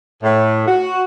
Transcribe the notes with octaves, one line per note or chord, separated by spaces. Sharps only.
A2
F#4